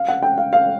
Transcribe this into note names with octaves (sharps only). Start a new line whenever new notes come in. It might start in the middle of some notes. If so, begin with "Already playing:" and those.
Already playing: F5
F#5
G5
F5
F5